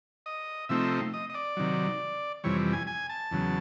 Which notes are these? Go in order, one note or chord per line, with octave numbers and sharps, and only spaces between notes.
D#5
C3 F3 A3 C4 D#4 E5
D#5
D#5
D5
C3 D#3 F#3
F2 C3 E3 G3 C#5
G#5
G#5
A5
E2 C#3 F#3